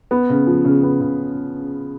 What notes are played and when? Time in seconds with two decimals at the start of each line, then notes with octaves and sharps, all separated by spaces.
0.11 B3
0.30 C#3
0.47 F3
0.65 C#3
0.83 B3
1.00 C#3